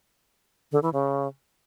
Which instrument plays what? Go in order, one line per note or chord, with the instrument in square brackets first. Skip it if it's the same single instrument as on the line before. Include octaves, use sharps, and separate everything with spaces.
[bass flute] D3
E3
C#3